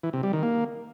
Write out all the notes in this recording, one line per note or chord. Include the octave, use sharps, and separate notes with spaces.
E3
C3
G3
D#3
A#3